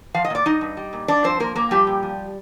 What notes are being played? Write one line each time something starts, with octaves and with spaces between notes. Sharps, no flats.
F3 F5
D#5
A#2 D5
G3 D#4 D#5
G2
G3
A#2
G2 D4 D5
F3 C4 C5
A#2 A#3 A#4
A#2 A#3 A#4
F3 G3 G4
A#2
F3